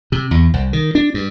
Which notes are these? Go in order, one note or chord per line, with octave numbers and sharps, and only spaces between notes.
C3
E2
C2
D#3
D4
G2